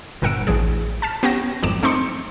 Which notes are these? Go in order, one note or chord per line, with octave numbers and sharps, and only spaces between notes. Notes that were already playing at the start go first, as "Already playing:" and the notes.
G1 A#2 A#4 F#5 E6 D7
A1 E3 D4 G#4
A5 F6 B6
B3 C#4 G4 G5 A#6 E7
G#1 F2 F#3 D6 E7
A3 C4 D#4 C6 D6 C#7